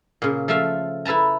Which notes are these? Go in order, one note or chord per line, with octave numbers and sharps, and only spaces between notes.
A#2 C#3
F3 A3 E5 F5
E4 A4 B4 A5 A#5